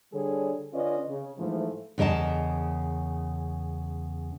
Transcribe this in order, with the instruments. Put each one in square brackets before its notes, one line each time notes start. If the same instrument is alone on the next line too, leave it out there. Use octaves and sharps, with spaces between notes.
[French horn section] D3 G3 G#4 A4 C#5
D3 C#4 F4 B4 D5 D#5
C#3
G#2 E3 F3 G#3 A3
[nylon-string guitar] E2 C#3 A#4 D#5 A5